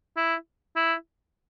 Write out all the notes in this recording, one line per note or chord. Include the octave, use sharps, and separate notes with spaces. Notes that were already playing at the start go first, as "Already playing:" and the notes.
E4
E4